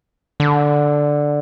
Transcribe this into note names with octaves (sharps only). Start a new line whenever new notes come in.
D3